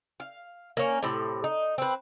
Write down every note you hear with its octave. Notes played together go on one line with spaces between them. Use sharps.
F5
A#3 C#4
A2 C3
D#4
C4 B4